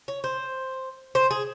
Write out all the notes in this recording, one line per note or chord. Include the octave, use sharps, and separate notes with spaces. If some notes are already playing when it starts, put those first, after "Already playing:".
C#5
C5
C5
G#4